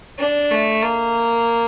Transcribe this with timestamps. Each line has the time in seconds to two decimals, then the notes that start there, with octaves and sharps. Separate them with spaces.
0.19 D4
0.51 A3
0.83 A#3